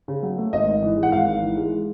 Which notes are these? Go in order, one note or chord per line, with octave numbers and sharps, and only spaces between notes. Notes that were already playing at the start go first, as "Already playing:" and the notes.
C#3
F#3
A3
G#1 D#5
G#2
E3
G#3
F#5
G#1 F5
G#2
E3
G#3